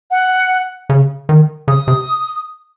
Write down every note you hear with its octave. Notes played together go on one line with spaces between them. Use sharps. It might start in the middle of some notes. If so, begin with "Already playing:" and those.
F#5
C#3
D#3
C#3 D#6
C3